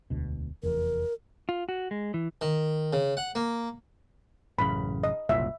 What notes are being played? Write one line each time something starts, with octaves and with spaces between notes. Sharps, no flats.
E1 D2 B2
F1 E2 A#4
F4
F#4
G#3
E3
D#3
C#3
F#5
A#3
A1 F#2 C#3 B5
D#5
F#1 C2 A#2 E5